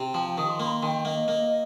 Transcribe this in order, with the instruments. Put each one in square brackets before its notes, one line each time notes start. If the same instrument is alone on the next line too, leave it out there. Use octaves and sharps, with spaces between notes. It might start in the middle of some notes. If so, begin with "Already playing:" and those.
Already playing: [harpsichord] C3
[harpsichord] F3 [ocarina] G5
[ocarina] G5
[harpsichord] D#3 [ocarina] D#6
[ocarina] C6
[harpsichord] A#3 [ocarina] C6
[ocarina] A#5
C6
[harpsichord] D#3 [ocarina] G5
[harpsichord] A#3 [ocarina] D#5
[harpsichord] A#3